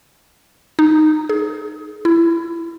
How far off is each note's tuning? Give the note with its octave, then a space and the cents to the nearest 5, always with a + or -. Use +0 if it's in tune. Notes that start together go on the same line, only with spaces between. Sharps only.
D#4 -15
G#4 +25
E4 +20